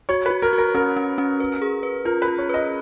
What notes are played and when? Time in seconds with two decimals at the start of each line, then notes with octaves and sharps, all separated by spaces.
0.09 F#4 C#5
0.26 F#4 B4
0.42 A#4
0.53 F#4
0.58 A#4
0.74 C#4 A#4
0.96 C#4
1.18 C#4
1.40 B4
1.62 G#4
1.83 B4
2.05 F4 A#4
2.22 B4
2.28 F4
2.38 C#5
2.49 B4 D#5